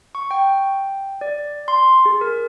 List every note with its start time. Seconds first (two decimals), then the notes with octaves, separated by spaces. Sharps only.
0.15 C#6
0.31 G5
1.21 D5
1.68 C6
2.06 G#4
2.21 A#4